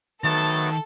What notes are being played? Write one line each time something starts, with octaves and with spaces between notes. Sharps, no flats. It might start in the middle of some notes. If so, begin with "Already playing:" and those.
D#3 F#3 A3 B3 A4 A5